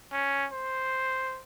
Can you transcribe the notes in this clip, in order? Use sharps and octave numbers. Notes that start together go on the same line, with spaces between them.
C#4
C5